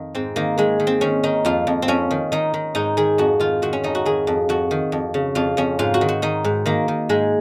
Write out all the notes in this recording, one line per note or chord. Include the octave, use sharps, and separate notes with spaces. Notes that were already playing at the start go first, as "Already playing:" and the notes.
Already playing: F2 D#3
G#2 C4
D#3 A#3
D#3 G#3
D#3
C4
D#3 C#4
D#3 D#4
F2 F4
F2
C4
F2 C#4
D#3
D#3 D#4
D#3
G#2 D#4
D#3 G#4
F2 F#4
D#3 F4
D#3 F#4
C#4
F2 D#4
F#4
D#3 G#4
F2
F2 F#4
D#3
F2
C#3
F2 F4
F2 C#4
G#2 F4
F#4
D#3
F#4
D#3 D#4
G#2
D#3 A#3
D#3
G#2 G#3